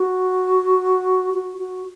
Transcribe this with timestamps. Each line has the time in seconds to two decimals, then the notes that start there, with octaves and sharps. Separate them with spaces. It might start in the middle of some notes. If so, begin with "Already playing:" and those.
Already playing: F#4
1.34 F#4
1.58 F#4